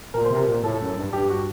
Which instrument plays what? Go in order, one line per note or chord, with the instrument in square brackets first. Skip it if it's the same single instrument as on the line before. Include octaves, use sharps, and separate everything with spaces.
[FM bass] A#2 [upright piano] A#4
[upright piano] C5
[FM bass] C3 [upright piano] A#4
[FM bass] A#2
[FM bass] A2 [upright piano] A4
[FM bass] F#2
G2
[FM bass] G2 [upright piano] G4
[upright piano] F#4